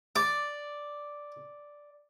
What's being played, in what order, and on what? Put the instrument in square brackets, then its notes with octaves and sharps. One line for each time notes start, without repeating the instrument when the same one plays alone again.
[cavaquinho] D5 [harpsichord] D6